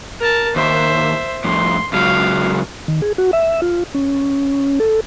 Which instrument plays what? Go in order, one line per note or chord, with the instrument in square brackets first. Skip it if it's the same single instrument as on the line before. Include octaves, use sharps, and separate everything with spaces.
[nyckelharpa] A#4 A5
[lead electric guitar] D#2 [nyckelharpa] C5 E5
[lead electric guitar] F2 A2 [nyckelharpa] C6
[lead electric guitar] C#2 F#3 [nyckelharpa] F5
[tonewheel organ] D#3
G#4
F#4
E5
F4
C#4
A4